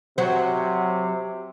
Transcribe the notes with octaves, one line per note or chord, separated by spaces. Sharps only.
C3 F#3 C5